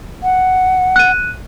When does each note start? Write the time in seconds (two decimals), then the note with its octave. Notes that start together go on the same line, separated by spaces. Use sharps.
0.23 F#5
0.96 F#6 D#7